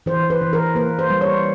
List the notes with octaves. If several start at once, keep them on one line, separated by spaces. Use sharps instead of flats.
E3 C5
B4
E3
A#4
A#3 B4
C5
G3
C#5